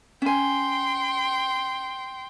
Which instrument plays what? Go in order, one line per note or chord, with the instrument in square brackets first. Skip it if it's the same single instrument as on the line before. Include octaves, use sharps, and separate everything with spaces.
[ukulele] C#4 G#5 [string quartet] G5 C6